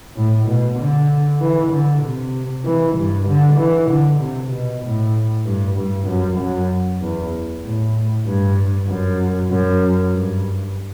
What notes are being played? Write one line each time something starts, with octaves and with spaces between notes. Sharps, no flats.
A2
B2
D3
E3
D3
C3
E3
G2
D3
E3
D3
C3
B2
A2
G2
G2
F#2
F#2
E2
A2
G2
F#2
F#2
G2